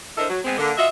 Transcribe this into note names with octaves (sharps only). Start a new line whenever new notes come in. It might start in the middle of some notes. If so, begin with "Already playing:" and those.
D4 E4 A4 A#4 C5 D#5
F#3
G#3 B3 C4
D3 A#3
F4 F#4 D#5 E5